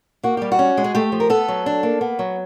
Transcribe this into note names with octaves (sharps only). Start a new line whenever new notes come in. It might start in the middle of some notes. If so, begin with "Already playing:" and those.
A#3 F#4
G3 G4
F#4
C#4
G#3
G#4
A3 G4
F3
A#4
B3 A4
F#3
D4
A#3
B3
F#3